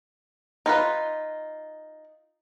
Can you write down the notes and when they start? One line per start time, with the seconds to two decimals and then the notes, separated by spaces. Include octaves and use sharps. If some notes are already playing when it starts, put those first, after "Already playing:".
0.66 D#4 F4 B4